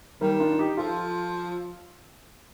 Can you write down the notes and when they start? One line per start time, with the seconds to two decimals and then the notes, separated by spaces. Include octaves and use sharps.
0.21 D#3 G3 A#3
0.40 D4 F4
0.59 D#4 G4
0.77 F3 F4 A4